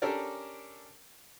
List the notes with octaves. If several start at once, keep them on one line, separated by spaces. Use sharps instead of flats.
C#4 D4 G4 A4 A#4 D5